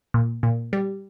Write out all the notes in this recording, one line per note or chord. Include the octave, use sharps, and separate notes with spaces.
A#2
A#2
G3